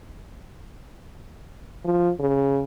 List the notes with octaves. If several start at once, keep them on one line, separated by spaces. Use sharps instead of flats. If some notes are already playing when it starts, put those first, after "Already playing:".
F3
C#3